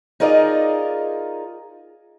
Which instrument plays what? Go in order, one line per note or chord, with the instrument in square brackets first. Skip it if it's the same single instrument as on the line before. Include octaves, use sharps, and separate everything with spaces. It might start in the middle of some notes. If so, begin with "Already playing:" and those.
[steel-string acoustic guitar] D#4 F4 G#4 A#4 D5 D#5